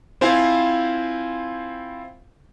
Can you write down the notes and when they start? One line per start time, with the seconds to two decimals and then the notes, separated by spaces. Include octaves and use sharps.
0.21 C4 E4 F4 C5 F5 G#5